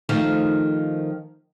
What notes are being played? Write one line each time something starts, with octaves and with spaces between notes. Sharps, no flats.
D#3 F3 A3